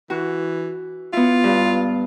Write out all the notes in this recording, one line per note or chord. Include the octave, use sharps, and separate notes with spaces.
E3 F#4
B3 E4 F4
G2